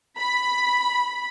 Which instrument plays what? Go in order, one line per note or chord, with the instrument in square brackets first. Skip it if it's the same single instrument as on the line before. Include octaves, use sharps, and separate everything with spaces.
[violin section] B5